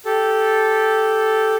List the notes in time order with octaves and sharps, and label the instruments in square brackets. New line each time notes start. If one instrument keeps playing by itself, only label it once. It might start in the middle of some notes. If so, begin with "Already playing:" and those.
[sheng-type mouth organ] G4 A4